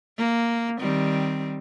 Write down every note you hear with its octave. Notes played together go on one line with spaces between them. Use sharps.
A#3
D#3 G3 C4